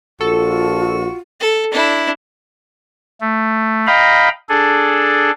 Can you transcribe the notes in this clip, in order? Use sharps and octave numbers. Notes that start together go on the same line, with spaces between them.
A#1 F4 F#4 A4
A4
D4 E4
A3
D#5 F5 G5 A#5 B5
D4 G#4 A4